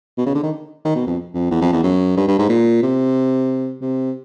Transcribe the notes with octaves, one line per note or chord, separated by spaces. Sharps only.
B2
C#3
D3
D#3
D#3
B2
F2
F2
E2
F2
E2
F#2
G2
G2
G#2
A#2
C3
C3